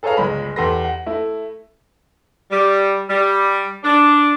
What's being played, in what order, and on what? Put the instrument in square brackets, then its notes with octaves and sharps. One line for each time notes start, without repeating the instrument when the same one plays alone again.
[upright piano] G#4 A4 B4 C#5 F5 A#5
G1 C#2 G#3 B5
E2 G4 A4 B4 C6 A#6
F#5
A3 E4
[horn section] G3
G3
D4